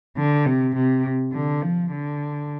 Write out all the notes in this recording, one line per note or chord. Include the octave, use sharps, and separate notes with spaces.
D3
C3
C3
D3
F3
D3